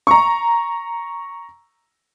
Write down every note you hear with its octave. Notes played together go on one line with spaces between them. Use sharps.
A#5 C#6